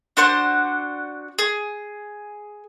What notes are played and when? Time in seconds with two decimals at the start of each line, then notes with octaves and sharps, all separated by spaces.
0.17 D4 F#4 C5 F#5
1.39 G#4